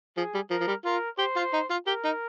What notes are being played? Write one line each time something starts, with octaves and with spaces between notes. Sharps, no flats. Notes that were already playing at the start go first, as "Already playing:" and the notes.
F3 G#4
G3
F3 A#4
F3
G3
F4 A#4
G4 C5
F4
D#4
F4
G4 A#4
D#4